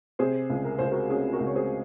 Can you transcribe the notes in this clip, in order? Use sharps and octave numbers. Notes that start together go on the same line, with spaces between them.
C3 G#4 C5
C#2
A#4
C#2 C5
F#4 A#4
C#4 G#4
F#4 A#4
C#2
C#5
G#4 C5